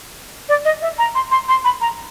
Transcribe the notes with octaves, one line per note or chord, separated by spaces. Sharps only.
D5
D#5
E5
A#5
C6
C6
C6
B5
A#5